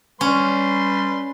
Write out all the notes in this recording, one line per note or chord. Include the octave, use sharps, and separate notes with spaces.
G3 C#4 B4 C6